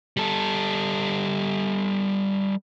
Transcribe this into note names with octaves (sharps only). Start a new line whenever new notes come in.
G3 A4